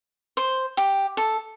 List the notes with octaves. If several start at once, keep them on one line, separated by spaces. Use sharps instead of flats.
C5
G4
A4